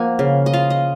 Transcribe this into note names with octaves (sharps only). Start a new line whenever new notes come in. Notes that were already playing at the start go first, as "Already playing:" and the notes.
Already playing: F3 A#3 F#5 G#5
C#3
D#5
F4 F5
D#5